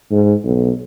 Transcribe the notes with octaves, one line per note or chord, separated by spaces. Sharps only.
G#2
B1